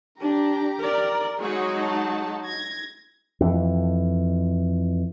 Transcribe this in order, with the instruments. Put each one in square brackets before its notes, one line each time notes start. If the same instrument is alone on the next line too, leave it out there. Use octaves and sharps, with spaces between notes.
[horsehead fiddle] D4 [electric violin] G4 A#5
[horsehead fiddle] A#4 D5
[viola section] F#3 G#3 D#4 [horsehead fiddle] F#4 [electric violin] G#4 C#5
[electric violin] A5
G#6 A#6
[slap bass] F2 E3